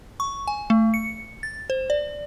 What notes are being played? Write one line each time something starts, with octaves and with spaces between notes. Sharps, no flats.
C#6
G#5
A3
C#7
A6
C5
D5